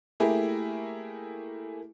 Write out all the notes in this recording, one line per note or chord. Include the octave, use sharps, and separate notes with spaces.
A3 A#3 E4 G4 G#4 A#4